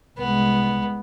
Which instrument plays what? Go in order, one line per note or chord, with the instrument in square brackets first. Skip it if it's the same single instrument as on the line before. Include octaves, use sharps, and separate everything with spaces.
[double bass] C2 G#3 [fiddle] B3